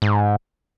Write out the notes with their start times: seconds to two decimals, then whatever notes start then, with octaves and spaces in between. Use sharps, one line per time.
0.02 G#2